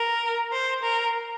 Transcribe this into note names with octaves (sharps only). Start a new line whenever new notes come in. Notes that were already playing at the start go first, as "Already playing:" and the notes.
Already playing: A#4
C5
A#4